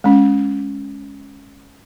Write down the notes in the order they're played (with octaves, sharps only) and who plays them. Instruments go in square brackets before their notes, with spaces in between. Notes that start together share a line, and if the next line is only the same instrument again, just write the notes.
[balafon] G#3 C#4